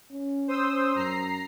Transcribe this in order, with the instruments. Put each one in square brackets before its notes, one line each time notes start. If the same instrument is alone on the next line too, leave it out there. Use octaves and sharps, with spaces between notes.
[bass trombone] C#4
[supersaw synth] C5 D#6 E6
[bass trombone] F#2 [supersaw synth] A#5 C7